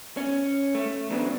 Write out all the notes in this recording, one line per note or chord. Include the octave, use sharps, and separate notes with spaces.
C#4
A3
C#3 E3 F#3 B3 C4 D4